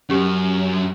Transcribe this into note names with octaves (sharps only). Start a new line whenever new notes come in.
F#2 C#4 G4